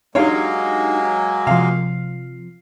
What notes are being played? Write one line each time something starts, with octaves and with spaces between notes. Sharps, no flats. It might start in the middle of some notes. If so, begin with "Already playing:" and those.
F#3 G#3 A#3 D4 D#4 G4 C#5 F5
C3 F3 F5